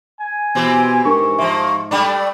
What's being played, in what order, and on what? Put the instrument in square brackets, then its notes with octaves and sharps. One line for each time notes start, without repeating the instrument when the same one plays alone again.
[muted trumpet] G#5
[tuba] B2 [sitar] E3 C4 G4
[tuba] G#2 [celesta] D4 A#4 [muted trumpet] C#6
[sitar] F3 A#3 [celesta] E5 C6
[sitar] G3 A3 D4 [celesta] G5 B5 D6